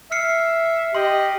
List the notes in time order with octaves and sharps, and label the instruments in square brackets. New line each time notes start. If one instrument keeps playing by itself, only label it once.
[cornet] E5 [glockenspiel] F6 C7 C#7
[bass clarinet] G4 [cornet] D#5 [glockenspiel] C6